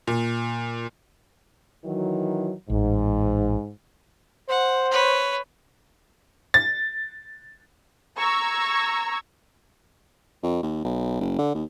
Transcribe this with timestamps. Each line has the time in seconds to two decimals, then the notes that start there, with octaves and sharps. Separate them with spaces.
0.07 A#2
1.85 D#3 E3 F#3
2.70 A1 G#2
4.49 C5 F#5
4.91 B4 C#5
6.54 A6
8.17 A#5 C#6 E6 G#6
10.43 F2
10.63 D#2
10.84 B1
11.21 F#1
11.38 D3
11.55 D#2